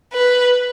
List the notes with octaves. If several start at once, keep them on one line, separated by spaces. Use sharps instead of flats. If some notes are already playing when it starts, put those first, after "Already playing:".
B4